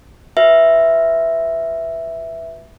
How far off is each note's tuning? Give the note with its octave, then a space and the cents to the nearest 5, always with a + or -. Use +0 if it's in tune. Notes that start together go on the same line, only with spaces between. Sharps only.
F#4 +0 B4 +0 E5 +0